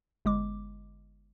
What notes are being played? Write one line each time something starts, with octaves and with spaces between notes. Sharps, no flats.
G1 G#3 D6